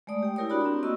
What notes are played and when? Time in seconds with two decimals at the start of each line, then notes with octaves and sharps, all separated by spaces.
0.07 G#3 A3 D5 D#6
0.23 G4 G5
0.36 E4 G4 A#4 C#5 D#6
0.50 D4 F#4 D5 B5
0.64 C4 A#5
0.83 A#3 F#4 A#4 D#5 C#6 E6